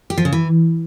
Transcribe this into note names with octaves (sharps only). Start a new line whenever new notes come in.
G4
F3
C#3
E3